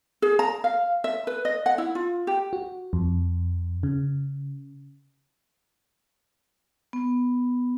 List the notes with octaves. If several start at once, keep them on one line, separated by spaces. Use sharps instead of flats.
G#4
A#5
F5
E5
B4
D#5
F#5
E4
F4
G4
F#4
F2
C#3
B3